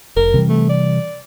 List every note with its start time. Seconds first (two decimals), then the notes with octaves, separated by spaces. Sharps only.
0.17 F1 A#4
0.34 C3 E3 G3
0.49 A3
0.69 D5